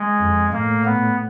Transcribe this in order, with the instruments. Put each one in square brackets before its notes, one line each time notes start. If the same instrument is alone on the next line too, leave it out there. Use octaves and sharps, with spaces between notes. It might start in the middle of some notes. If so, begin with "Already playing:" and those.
Already playing: [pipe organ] G#3
[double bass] F2
[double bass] A2 [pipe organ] A#3
[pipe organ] B3